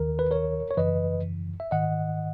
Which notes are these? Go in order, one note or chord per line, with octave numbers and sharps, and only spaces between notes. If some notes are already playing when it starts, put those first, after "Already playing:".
Already playing: D#2 D#3 A#4
B4
A#4 C#5
C#5
F#2 C#3 E3 B4 D#5
E5
G#2 D#3 D#5 F#5